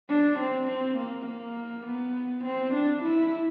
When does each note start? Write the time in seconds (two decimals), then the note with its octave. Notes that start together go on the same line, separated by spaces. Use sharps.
0.10 D4
0.39 C4
0.68 C4
0.98 A#3
1.27 A#3
1.86 B3
2.45 C4
2.74 D4
3.04 E4